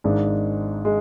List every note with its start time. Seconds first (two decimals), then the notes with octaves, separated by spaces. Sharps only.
0.04 G#1 G#2 G#3 D4
0.85 G#3